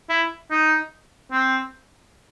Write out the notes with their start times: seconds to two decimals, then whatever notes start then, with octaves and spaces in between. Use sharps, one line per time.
0.10 E4
0.51 D#4
1.32 C4